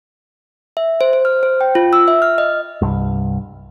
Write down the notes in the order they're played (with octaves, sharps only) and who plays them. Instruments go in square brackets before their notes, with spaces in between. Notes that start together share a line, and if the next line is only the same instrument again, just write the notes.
[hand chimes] E5
C5
C5
F6
C5
G5
F4
E6
E5
F6
D#5
[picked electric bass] C2 G2